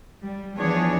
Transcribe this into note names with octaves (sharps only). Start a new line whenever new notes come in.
G3
E3 F3 B3 D4 G#4 C#5